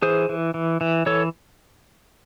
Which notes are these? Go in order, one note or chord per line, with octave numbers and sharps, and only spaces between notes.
E3 G#4 C5
E3
E3
E3
E3 A4 C#5